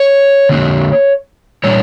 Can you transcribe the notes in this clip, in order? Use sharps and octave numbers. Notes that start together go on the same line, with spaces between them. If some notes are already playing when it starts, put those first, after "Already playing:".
Already playing: C#5
D3 A#3 D4
A#2 G3 D4 C#5